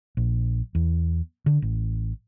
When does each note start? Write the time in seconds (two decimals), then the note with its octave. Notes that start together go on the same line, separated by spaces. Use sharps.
0.17 A#1
0.75 E2
1.46 D3
1.62 A1